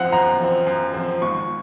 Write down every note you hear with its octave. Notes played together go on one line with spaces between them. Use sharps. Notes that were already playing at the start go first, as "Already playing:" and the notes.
Already playing: F#2 F3 C4 F5 F#5
F#2 A#5
F3 C4
F#2
F3 C4
G#1 C#6